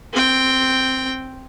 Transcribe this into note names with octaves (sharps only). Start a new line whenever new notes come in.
C4 G5